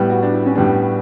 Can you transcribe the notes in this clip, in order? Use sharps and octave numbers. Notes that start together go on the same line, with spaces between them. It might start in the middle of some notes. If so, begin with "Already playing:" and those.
Already playing: A2 G3 B3
F#4
D4
E4
C#4
A2 G3 B3 D4